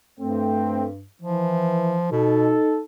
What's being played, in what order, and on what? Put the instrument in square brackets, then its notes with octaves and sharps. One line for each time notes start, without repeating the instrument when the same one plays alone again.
[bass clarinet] G2 [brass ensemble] A3 C4
[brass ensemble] E3 [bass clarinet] F3
[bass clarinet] B2 [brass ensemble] D#4 A4